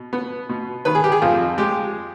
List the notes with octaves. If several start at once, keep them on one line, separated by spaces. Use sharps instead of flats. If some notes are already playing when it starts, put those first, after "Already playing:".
Already playing: B2
B3
B2
D#3 B4
G#4
G4
G#4
F2 F4
G#3 G4